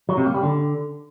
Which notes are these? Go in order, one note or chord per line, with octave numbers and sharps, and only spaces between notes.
F#3
C3
A#3
G3
D3